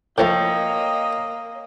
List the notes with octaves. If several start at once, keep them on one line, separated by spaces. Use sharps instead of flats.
A2 F3 A3 A#3 C#5 D#5 G5